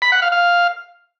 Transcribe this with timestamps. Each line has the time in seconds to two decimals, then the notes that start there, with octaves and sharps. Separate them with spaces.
0.02 B5
0.12 F#5
0.22 F5
0.32 F5